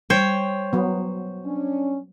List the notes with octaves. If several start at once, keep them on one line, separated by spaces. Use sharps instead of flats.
G3 C5 C#5 G5
F#3 B3
C#4 D4